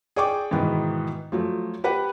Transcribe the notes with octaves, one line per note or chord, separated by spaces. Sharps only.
G#4 D5 G5 C#6 D6
G#2 B2 D#3 E3 B3
F3 F#3 A3
G4 B4 F#5